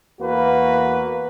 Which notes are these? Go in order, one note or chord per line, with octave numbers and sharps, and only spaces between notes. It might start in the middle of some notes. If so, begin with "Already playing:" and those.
E2 A#3 F#4 B4